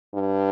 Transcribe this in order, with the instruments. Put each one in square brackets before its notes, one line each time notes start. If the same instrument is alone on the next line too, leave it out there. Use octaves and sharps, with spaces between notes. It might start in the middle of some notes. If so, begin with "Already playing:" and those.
[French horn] G2